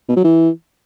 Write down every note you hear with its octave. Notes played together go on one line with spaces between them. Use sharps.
B2
F#3
E3